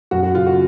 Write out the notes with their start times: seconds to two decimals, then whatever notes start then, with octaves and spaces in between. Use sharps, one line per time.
0.11 F#2 F#4
0.23 F#4
0.35 C#3 F4
0.47 F#4